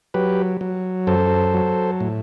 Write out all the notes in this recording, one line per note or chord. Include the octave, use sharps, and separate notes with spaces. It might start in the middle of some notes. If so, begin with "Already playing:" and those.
F#3 G4 B4
F#3
F#2 A4 C5
F#3
A2